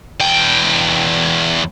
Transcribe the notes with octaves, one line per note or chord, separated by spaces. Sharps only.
E2 G5